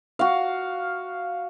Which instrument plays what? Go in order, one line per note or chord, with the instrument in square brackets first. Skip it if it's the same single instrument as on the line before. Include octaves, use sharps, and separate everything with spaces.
[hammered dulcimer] F#4 F5